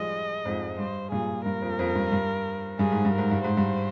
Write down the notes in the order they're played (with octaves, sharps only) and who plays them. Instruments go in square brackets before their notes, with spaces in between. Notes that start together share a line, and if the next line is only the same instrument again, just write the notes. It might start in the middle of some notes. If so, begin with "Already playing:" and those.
Already playing: [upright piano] F3 G3 G#3 [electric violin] D#5
[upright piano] F2 G#2
[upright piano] G2 [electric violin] C5
[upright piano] G2 A#2 [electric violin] G#4
[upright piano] G2 [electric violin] A#4
[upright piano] F2
F2
G2
G2
[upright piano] G2 [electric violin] G#4
[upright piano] G#2
G2
[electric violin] A#4
[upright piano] G#2
G2
[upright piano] G#2 [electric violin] C5
[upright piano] G2